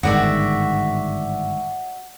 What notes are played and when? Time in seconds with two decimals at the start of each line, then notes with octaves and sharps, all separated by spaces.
0.03 G1 G#2 D#3 F#4 D5 E5